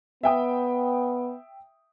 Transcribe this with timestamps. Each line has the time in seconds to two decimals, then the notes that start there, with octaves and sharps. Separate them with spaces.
0.23 B3 E5 G5 D#6